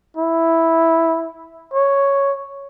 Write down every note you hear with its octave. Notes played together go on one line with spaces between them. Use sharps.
E4
C#5